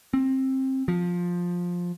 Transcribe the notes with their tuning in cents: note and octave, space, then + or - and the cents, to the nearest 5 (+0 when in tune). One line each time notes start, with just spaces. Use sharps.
C4 +20
F3 +15